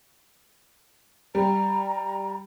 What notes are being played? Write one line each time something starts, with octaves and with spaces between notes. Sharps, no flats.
G3 A#5